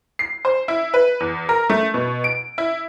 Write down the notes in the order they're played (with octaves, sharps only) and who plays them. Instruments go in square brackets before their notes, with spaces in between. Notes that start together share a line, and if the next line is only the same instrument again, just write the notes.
[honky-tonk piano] C7
C5
E4
B4
E2
A#4
A3
B2
D7
E4